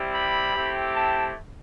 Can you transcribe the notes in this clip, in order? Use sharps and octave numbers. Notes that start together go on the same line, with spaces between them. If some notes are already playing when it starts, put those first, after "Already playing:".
Already playing: G3 C4 E4 G4
B5
A3 C4 E4 G4
A5